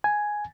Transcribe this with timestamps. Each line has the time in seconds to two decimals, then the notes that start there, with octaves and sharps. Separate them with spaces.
0.04 G#5